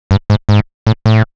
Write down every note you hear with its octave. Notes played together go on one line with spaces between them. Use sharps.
G2
G#2
G#2
A2
A2